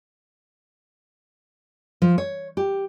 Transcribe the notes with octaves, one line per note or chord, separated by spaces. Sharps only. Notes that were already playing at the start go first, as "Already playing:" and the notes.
F3
C#5
G4